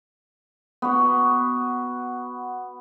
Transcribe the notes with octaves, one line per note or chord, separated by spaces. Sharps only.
B3 F#4